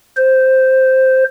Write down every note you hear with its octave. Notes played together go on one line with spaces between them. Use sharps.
C5